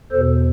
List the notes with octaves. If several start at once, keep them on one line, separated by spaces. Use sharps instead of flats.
E2 B2 A4 C5